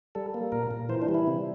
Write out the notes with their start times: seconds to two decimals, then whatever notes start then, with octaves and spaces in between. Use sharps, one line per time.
0.15 G3 A4
0.34 A#3
0.52 A#2 A#4
0.71 A#2
0.89 E3 C5
1.02 D4
1.09 G3
1.14 E4
1.27 C3